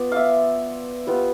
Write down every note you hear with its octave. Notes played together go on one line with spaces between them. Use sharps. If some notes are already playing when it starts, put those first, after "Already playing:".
Already playing: B3 F4 D5
E5 F5
G3 B3 F4